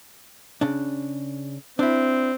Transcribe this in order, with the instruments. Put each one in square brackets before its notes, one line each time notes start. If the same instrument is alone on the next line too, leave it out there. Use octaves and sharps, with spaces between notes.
[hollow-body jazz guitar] C#3 D4
[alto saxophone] C4 [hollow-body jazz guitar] D4 E4